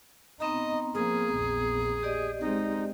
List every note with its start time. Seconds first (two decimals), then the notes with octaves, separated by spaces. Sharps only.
0.40 B3 C4 D#4 D#5 A#5
0.94 F3 A#3 G#4
1.33 A#1 E2
2.03 G4 D5 D#5
2.40 G#3 C4 D#4